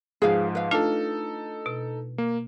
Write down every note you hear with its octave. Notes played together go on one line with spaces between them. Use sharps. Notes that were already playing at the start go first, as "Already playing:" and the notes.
G#2 F3 G#4 B4 F5
B4 F5
A3 D4 D#4 F4 A4
B2
A#3